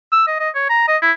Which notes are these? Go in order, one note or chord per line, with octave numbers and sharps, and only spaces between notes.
E6
D#5
D#5
C#5
A#5
D#5
E4